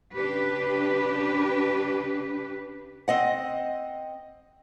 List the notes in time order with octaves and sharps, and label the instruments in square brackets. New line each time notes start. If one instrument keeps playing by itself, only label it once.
[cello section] C#3 D4 G4 B4
[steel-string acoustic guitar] C4 D#5 F#5